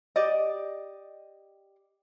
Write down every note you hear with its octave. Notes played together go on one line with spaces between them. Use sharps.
G4 D5 D#5